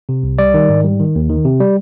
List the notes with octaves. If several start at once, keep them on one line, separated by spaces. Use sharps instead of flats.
C3
C2
G3 D5
D#3
G#2
G3
D#3
D#2
D#3
C3
G3